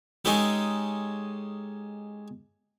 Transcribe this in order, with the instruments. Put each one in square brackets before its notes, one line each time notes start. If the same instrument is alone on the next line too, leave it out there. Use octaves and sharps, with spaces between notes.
[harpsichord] G#3 C#4 D#4 G4 A4